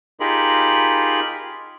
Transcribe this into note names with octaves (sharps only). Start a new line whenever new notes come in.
D#4 F4 G4 G#4 A#4 B5